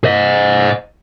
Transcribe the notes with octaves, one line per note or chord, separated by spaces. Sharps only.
C5 D#5